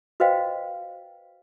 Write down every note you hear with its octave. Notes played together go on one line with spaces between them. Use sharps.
F#4 B4 C5 D#5 F5 G5